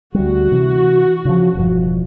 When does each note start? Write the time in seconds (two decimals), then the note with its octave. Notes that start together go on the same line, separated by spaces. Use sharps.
0.14 D2 G3 F#4
0.52 C3 E3
1.25 C#3 F3
1.55 E1 G2 F3